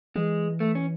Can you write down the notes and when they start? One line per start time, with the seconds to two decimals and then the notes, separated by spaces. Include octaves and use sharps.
0.16 E3 G#3
0.60 A3
0.75 C#4